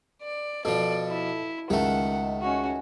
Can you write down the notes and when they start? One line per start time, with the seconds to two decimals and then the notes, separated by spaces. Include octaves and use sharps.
0.22 D5
0.65 B2 F3 A4 D5
1.08 E4
1.70 C#2 D#3 A3 F#5
2.42 C#4 F#4